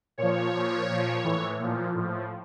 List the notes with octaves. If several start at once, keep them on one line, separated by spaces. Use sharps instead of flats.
A#2 F3 C#5
A#2 F3
A#2 F3
A2 E3
A#2 F3
A2 F3